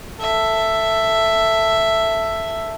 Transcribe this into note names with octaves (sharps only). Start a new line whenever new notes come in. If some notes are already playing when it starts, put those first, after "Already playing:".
A4 E5